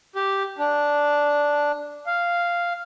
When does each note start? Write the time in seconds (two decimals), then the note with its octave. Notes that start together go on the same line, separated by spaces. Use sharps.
0.15 G4
0.58 D4
2.06 F5